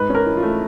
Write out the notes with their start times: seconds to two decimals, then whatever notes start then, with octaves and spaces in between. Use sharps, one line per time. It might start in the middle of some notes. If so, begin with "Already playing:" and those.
Already playing: G#2 B4
0.10 C#4
0.15 A#4
0.26 E3
0.37 F4
0.43 A3